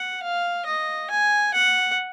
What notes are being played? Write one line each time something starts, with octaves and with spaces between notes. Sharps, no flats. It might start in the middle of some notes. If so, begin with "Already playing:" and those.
Already playing: F#5
F5
D#5
G#5
F#5